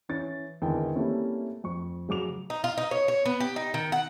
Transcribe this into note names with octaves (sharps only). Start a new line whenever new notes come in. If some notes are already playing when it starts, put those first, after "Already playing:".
E3 C#4 A6
G#1 E2 D3 A#4 G5
G3 A3 A#3 C4 C#4 E4
F2 C#6
C#3 F#3 D6 F7
D#4
F4
D#4
C#5
C#5
B3
G4
D#4
D#3
F#5